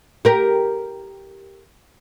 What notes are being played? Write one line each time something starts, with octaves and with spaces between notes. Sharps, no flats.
G4 A#4